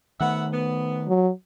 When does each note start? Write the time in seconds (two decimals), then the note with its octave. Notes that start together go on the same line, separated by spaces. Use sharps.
0.20 D#3 A3 B3 E5 F#5
0.53 B3
1.08 F#3